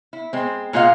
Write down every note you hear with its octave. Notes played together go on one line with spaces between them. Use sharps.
E4
G#3 C4
A#2 G#3 F4 D#5 F5 F#5